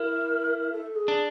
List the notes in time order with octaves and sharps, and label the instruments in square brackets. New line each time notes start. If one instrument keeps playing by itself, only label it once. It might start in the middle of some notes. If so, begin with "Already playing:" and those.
Already playing: [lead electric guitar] E4 [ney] A#4
[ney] A4
G#4
[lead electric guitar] D4